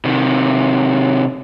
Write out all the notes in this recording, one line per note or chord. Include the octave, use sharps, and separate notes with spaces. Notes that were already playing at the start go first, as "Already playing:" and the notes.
C3 D#3